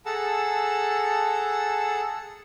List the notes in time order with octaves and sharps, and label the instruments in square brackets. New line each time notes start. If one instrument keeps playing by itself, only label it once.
[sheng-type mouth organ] G#4 A4 F#5 A5 A#5 E6